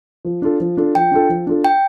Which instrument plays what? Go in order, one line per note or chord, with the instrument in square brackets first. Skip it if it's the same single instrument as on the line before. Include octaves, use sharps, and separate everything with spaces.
[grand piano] F3
D4 F4 A4
F3
D4 F4 A4
[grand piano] F3 [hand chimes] G5
[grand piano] D4 F4 A4
F3
D4 F4 A4
[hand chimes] G5